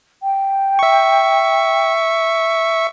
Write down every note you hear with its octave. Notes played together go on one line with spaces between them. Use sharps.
G5
E5 C#6